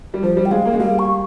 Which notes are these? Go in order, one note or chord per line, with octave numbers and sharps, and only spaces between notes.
G3
F3 C5
G3
G5
G#3 F5
A#3
G#3
G3 F5
C#6